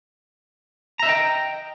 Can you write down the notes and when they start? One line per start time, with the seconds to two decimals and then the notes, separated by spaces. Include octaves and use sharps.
0.99 A#5
1.03 E5
1.06 D#5
1.09 G5